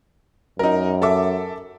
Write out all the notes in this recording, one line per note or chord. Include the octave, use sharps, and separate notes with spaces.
F#2 D#4 A#4
A4 E5 D6